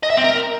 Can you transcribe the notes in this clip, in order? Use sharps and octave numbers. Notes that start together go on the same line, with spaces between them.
D#5
E5
C4
A#4